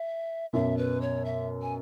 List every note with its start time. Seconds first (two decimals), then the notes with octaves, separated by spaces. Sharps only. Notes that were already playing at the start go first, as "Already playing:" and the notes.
Already playing: E5
0.53 F#2 B2 E5
0.78 B4
1.01 C#5
1.25 E5
1.62 G#5